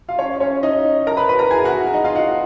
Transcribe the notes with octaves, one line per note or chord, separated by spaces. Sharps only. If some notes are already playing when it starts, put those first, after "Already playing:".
F4 F5
C#4 C#5
C#4 C#5
D#4 D#5
A#4 A#5
B4 B5
B4 B5
A#4 A#5
G#4 G#5
F#4 F#5
D#4 D#5
F4 F5
F#4 F#5